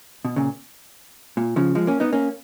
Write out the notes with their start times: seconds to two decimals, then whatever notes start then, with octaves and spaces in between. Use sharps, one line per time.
0.25 B2
0.36 A#2 C#3
1.37 A#2
1.56 C#3 F3
1.75 F3 G#3
1.87 A#3 C#4
2.00 B3 D#4
2.13 A#3 C#4